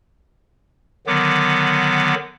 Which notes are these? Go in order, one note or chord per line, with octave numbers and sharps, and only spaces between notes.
D3 D#3 F#3 B3 D6